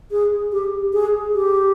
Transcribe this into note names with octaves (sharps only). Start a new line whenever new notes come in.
G#4
G4
G#4
G4